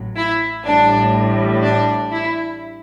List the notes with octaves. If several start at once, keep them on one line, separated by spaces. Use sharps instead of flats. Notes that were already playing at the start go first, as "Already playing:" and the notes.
Already playing: A1 A2 F#3
E4
A1 A2 G3 D4
D4
E4